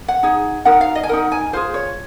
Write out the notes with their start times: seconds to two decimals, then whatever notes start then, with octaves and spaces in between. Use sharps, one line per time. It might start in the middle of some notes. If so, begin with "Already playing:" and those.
0.08 F#5
0.23 D#4 G#4
0.65 D#4 F#4 A#4 F#5
0.81 F5
0.95 D#5
1.03 G#5
1.09 D#4 F#4 A#4 F#5
1.32 G#5
1.53 F4 G#4 C5
1.74 C#5